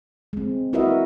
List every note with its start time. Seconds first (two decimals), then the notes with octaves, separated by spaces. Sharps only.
0.33 G#3 C4
0.73 E4 F#4 A#4 B4 D#5 E5